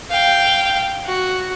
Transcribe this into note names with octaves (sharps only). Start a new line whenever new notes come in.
F5 G5
F#4